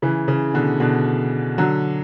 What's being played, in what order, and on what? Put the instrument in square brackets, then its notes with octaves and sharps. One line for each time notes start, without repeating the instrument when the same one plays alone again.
[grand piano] C#3 E3
C#3
B2 D3
B2 D3
D3 F#3